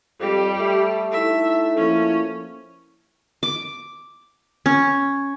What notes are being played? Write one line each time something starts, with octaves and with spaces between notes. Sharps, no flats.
F2 G3 G4
A3
D#4 E4 A4 E5
F3 A#3 C#4 E4
D6
C#4